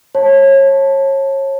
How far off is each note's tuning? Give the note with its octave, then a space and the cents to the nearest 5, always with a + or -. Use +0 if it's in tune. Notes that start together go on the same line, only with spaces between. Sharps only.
C#5 -30 A5 +0